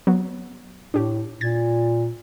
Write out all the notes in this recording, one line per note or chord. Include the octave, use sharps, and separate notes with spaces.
F#3 B3
A2 D4 G4
A#2 G#6 A6